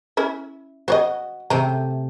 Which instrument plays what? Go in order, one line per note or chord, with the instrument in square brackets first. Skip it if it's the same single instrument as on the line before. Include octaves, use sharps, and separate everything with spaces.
[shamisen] C#4 E4 E5
[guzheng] F#4 [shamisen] C5 C#5 D#5
[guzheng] C3 A3 G5 [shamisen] A#5